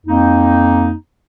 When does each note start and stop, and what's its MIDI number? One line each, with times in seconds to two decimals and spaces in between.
0.06 0.93 41
0.06 0.93 58
0.06 0.93 63